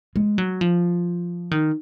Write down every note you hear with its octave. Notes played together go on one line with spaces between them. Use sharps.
G#3
F#3
F3
D#3